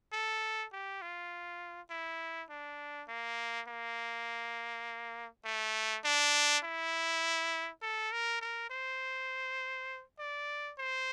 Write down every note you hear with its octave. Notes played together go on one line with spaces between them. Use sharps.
A4
G4
F4
E4
D4
A#3
A#3
A3
D4
E4
A4
A#4
A#4
C5
D5
C5